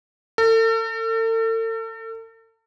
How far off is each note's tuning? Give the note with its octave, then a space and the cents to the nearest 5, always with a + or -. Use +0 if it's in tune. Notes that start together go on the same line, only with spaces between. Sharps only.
A4 +40